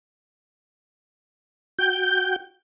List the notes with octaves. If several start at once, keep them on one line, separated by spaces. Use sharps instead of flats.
F#4 G5 G6